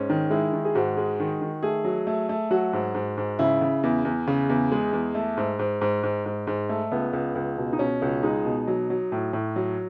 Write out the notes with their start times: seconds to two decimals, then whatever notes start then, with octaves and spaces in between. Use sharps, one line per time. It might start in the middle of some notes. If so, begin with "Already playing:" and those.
Already playing: G#2 C#4
0.10 D#3
0.30 G#3 E4
0.53 D#3
0.65 G#4
0.75 G#2 F#4
0.97 G#3
1.20 D#3
1.41 D#3
1.63 A3 G#4
1.85 F#3
2.07 A3
2.29 A3
2.51 F#3 F#4
2.73 G#2
2.95 G#2
3.18 G#2
3.39 C#3 E4
3.61 C#3
3.83 E2
4.05 E2
4.28 C#3
4.49 E2
4.72 G#3
4.93 E2
5.15 A3
5.37 G#2
5.59 G#2
5.81 G#2
6.03 G#2
6.26 G#2
6.47 G#2
6.69 A3
6.92 C#2 B3
7.13 C#2
7.35 C#2
7.58 B2
7.73 D#4
7.79 B2 C#4
8.02 C#2
8.23 G#3 D#4
8.45 B2
8.67 F#3
8.90 F#3
9.12 A2
9.33 A2
9.56 F#3